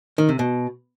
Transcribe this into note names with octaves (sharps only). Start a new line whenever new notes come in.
D#3
C3
B2